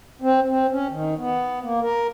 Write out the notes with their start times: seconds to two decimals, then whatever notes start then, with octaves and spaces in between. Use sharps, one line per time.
0.22 C4
0.48 C4
0.71 C#4
0.91 D#3
1.17 B3
1.61 A#3
1.82 A#4